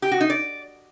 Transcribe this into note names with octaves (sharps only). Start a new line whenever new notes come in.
G4
F#4
D#4
D5